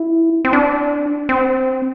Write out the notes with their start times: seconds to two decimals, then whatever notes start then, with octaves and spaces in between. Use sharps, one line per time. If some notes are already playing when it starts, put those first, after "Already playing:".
Already playing: E4
0.45 C4
0.53 D4
1.29 C4